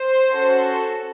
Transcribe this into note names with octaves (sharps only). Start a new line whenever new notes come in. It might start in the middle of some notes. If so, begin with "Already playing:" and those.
Already playing: C5
C#4 F#4 A4